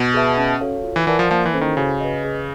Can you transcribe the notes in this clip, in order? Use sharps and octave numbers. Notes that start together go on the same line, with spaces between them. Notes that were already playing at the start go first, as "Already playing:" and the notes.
Already playing: B2
G#4 B4 E5 A5
C#4
F#4 A4 C#5 F5
F4
E3
E3 A#4 D5 F#5 A5
F3
F3 A#3
E3
C#4 E4 A4 C5
D#3
C#3 F#4
B4 D#5
G#4